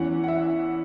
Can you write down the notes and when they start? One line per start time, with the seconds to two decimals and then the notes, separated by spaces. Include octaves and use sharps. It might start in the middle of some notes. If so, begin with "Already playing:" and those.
Already playing: E2 E3 C#4 F#5
0.24 F#5
0.28 E5